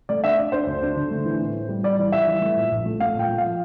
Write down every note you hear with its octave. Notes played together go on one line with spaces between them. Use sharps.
A3 D5
D4 E5
D4 D5
D4 C5
D2
D4
D3
A3
E3
A2
A2
G3
G3 D5
E3
G3 E5
E3
A3
A#2
A#1
A3
A3 F5
A#2 G5
A3
F5
F3